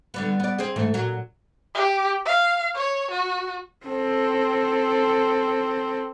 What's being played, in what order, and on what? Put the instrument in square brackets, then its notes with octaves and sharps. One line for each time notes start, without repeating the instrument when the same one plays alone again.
[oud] D3 G3 B3
B3 D5
C4 G#4
G#2 E3 A3
A#2 F#3
[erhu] G4
F5
C#5
F#4
[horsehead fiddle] C4 A4